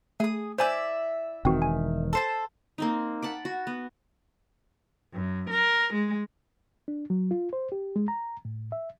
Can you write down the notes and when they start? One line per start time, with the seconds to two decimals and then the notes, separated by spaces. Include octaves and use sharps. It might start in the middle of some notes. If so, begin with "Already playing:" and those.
0.20 A3 G#4 D#6
0.58 E4 C5 D5 E5 G#5 G6
1.45 E1 D#3 C4 F#4
1.62 G#5
2.13 A4 C5 A5
2.78 A#3 C4 D#4
3.22 F#5 A5 B5 D6
3.45 F#4
3.67 B3
5.13 F#2
5.49 A#4
5.94 G#3
6.88 D4
7.10 F#3
7.31 F4
7.53 C5
7.72 G4
7.96 G#3
8.08 A#5
8.45 A2
8.72 E5